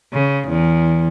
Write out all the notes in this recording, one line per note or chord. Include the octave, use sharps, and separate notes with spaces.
C#3
E2